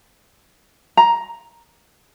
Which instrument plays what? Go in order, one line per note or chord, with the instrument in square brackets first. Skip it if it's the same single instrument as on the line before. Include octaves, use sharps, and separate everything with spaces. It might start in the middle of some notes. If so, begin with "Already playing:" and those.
[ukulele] A#5